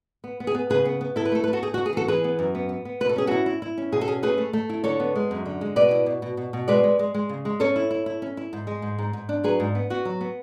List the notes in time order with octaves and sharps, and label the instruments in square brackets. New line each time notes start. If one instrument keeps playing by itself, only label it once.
[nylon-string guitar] B3
B3
G#4
B3
C#3 G#4 B4
B3
B3
E4 A4
B4
A3 A4
A3 B4
F#4 A4
A3 G#4
F#4
A3
G#4
E3 F#4 A4
E3 G#4 B4
B3
F#2
B3
B3
B3
B2 B4
A4
C#4 G#4
F#4 A4
E4
E4
E4
C#4
B2 G#4
A4
C#4 G#4
A3 G#4 B4
A3
A3
E4
D3 A4 C#5
B3
G#3
F#2
D3
G#3
B2 B4 D5
E4
B2
B2
B2
B2
G#3 B4 D5
G#3
G#3
G#3
C#3
G#3
C#4 A4 C#5
E4
E4
E4
C#4
E4
G#2
G#3
G#2
G#2
G#2
D4
F#3 G#4 B4
G#2
B3
B3 F#4
F#3
B3